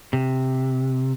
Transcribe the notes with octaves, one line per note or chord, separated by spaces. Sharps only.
C3